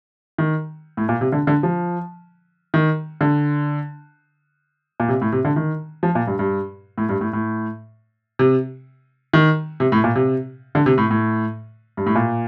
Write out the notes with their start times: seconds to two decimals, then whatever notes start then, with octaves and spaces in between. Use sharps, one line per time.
0.38 D#3
0.97 A2
1.09 A#2
1.21 C3
1.32 D3
1.47 D3
1.63 F3
2.74 D#3
3.21 D3
5.00 A#2
5.09 C3
5.21 A2
5.32 C3
5.45 D3
5.56 D#3
6.03 F3
6.15 A#2
6.27 G2
6.39 G2
6.98 A2
7.09 G2
7.21 A2
7.33 A2
8.39 C3
9.33 D#3
9.80 C3
9.92 A2
10.04 A#2
10.15 C3
10.75 D3
10.86 C3
10.98 A2
11.11 A2
11.97 G2
12.06 A2
12.15 A#2